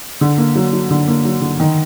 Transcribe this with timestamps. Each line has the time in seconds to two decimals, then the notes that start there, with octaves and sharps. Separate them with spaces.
0.21 D3
0.38 A#3
0.56 F#3
0.73 F#3
0.91 D3
1.08 A#3
1.25 F#3
1.41 D3
1.60 D#3